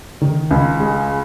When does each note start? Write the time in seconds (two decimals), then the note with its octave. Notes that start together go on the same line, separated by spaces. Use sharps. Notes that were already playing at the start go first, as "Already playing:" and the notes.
0.21 D#3
0.51 C#2
0.80 G#3